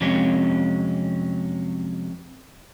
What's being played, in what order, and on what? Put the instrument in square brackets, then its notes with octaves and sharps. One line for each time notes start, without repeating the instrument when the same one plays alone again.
[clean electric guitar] F2 C3 F#3 G#3 C#4